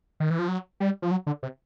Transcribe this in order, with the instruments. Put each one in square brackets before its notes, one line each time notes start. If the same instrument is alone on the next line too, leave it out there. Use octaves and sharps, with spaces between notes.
[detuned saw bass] D#3
E3
F3
F#3
G3
F3
F#3
D3
C3